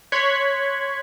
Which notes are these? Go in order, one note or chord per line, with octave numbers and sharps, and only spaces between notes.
C#5 C6 C#6 F#6 G#6 B6